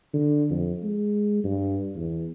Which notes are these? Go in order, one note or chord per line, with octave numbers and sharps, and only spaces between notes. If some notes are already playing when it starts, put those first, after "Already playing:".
D3
F2
G#3
G2
E2